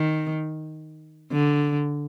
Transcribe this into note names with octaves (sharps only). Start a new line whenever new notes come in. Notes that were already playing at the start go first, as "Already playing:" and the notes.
Already playing: D#3
D3